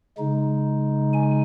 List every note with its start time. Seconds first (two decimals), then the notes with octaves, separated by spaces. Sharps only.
0.17 C#3 G#3 D#4
1.13 G#5